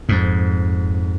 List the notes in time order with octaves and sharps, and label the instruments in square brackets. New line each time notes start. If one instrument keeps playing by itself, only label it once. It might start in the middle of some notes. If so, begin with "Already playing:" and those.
[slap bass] F2 G#2